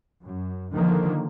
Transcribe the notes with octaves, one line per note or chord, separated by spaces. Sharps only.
F#2
D3 D#3 F3 A#3